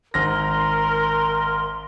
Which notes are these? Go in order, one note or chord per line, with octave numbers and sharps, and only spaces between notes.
G#1 A#4 C6 F6 A#6